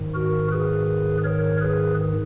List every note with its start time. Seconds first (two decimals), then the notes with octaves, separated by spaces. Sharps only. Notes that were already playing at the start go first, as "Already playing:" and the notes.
Already playing: G#2 D#3
0.14 F#4 A#4
0.52 G#4 B4
1.24 A#4 C#5
1.61 G#4 B4